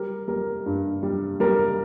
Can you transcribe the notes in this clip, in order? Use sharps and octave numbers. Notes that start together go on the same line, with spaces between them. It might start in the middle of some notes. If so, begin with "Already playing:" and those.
Already playing: G3 A#4
G3 A#4
G2
G3
G3 A#4